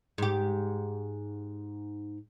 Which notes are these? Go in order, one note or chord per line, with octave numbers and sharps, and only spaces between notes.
G#2 G4